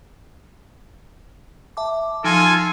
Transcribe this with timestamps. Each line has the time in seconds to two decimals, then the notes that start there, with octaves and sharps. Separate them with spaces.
1.77 E5 A5 D6
2.24 F3 D#4 F4 A4 G#5 D7